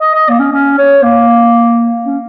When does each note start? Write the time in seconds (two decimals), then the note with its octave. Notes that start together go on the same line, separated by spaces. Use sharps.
0.01 D#5
0.14 D#5
0.29 A#3
0.39 C#4
0.52 C#4
0.78 C#5
1.03 A#3
2.06 C#4